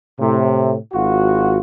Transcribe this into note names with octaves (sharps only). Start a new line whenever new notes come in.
A2 C3
G#1 F4 F#4